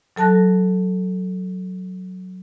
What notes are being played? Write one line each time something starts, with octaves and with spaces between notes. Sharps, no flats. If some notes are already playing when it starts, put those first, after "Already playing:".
F#3 A4 A5 F#6 A#6